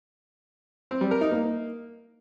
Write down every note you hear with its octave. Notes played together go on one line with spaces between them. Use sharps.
C4
G3
A#4
D#4
A#3